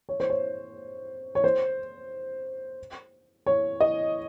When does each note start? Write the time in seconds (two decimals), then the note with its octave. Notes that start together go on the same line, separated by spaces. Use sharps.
0.09 C#5
0.20 C5
0.30 C#5
1.35 C#5
1.44 C5
3.46 C#5
3.81 D#5